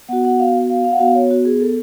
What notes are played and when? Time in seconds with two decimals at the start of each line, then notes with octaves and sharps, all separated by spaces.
0.09 B3 F#4 F#5
0.25 F#5
0.39 F5
0.70 F5
0.85 F5
0.92 F#5
0.99 B3 F#4 F5
1.15 C#5
1.31 F#4
1.45 G#4
1.61 A4